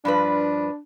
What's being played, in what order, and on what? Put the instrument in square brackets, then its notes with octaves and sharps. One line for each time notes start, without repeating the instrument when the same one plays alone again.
[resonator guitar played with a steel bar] G2 F3 B4 [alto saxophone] D4